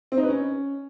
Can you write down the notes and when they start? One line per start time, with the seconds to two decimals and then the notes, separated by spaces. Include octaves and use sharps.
0.12 C4
0.17 D#4
0.23 B4
0.29 C#4